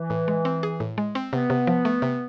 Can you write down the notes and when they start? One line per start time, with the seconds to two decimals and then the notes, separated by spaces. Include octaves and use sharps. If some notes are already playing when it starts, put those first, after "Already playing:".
Already playing: E3
0.10 A2
0.28 G#3
0.45 C4
0.63 G#4
0.80 A2
0.98 G#3
1.15 C4
1.33 C3 B3
1.50 C3
1.67 F3
1.85 A3
2.02 C3